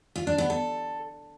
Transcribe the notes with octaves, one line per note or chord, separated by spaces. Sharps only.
F4
D4
B3
A4